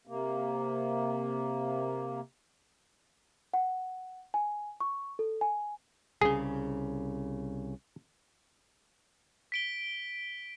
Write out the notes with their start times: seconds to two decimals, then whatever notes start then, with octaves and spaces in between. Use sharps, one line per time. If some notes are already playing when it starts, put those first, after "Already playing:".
0.07 C3 A#3
3.54 F#5
4.34 G#5
4.80 C#6
5.19 A4
5.41 G#5
6.21 C2 C#3 G#4
9.52 B6 D7 G7